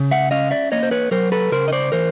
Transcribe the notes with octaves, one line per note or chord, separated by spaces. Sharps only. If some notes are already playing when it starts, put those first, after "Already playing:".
Already playing: C#3
E5 F#5
C#4 D#5 F5
D5 E5
A#3 C#5 D#5
C5
B4 C#5
F#3 A#4 C5
A4 B4
C#3 A#4 C5
D#5
C5 D5
E3 A#4 C5